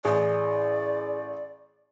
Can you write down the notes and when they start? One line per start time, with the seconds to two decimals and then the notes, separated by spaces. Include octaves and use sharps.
0.05 A1 G#4 D5